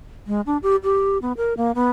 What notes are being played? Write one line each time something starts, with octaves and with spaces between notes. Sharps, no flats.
G#3
D4
G4
G4
B3
A#4
A#3
B3